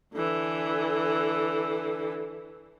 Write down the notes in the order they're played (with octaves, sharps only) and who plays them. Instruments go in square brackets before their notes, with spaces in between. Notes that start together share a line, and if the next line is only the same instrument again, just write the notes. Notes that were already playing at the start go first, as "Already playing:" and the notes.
[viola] D3 E3